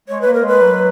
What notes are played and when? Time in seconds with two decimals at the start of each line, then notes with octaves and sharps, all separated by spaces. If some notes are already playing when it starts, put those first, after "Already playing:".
0.08 G#3 C#5
0.21 A#3 B4
0.34 A#4
0.43 G#3 B4
0.61 F#3